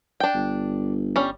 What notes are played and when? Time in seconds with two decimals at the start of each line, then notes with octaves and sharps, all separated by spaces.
0.20 D4 G5
0.34 G1
1.16 G3 C#4